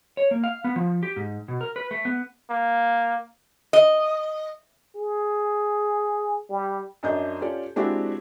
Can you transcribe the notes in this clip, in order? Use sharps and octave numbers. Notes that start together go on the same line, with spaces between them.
C#5
A#3
F5
B3
F3
G4
G#2
B2
A#4
B4
A3
B3
A#3
D#5
G#4
G3
F#2 D4 D#5 G6
C#4 F4 G4 A4 D5
G#3 C4 D4 E4 F#4 G4